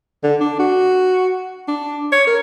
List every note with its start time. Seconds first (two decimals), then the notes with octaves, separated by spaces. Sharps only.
0.23 D3
0.40 D4
0.59 F#4
1.68 D4
2.12 C#5
2.27 A#4